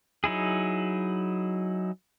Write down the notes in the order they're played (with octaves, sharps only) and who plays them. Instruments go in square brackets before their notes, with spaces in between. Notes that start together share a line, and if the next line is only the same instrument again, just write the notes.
[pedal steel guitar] F#3 D#4 E4 G#4